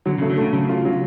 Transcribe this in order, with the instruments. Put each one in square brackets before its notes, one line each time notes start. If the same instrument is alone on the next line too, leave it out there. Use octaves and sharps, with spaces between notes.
[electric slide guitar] D3 [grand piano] F#3
[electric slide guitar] C#3
[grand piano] A3
[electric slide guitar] D3
[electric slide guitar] C#3 [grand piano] A3
[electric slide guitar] C#3 [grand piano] F#3
[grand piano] F4
F#3